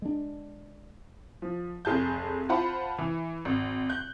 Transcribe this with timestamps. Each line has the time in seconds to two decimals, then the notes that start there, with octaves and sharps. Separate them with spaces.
0.02 G#3 D4
1.42 F3
1.85 F1 G#4 A5 G6
2.49 F4 C5 F#5 A5 B5
2.99 E3
3.45 G#1
3.89 F#6 G6